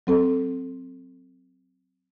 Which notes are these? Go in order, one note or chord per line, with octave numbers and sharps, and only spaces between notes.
F#3 C4 A4